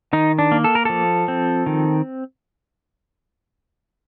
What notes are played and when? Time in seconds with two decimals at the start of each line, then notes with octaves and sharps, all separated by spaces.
0.13 D#3 D#4
0.39 D4
0.52 A#3
0.64 A4
0.75 A#4
0.85 F3 A4
1.28 C4
1.66 D#3